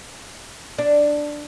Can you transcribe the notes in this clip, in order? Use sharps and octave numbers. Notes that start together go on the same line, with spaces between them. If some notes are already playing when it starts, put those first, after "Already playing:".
D4